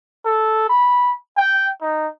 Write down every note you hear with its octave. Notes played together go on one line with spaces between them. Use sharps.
A4
B5
G5
D#4